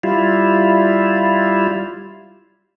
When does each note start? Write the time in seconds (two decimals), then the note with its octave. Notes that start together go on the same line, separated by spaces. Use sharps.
0.03 G3 E4 F4